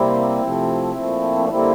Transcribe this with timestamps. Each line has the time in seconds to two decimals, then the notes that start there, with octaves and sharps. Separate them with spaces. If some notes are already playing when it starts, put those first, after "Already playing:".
Already playing: C3 G3 A#3 C4 E4
0.42 C3 F3 A3
0.96 A#2 F3 A3
1.39 D4
1.49 D3 G3 A#3 C4 E4